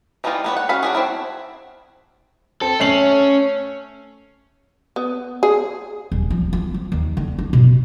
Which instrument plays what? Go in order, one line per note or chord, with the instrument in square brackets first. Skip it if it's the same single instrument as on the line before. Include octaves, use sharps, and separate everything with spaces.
[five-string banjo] E3 G3 A#3 D#4 F4
G3 B3 C#5
F#5
C#4 F#4 F5 F#5 B5
D4 F#4 G#4
C4 D4 E4
[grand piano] C4 [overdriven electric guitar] A4
[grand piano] A3 C7 F#7 [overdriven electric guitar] C#4
[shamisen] B3
G#4
[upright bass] D#1
F3
F4
F3
D#2
D3
D4
B2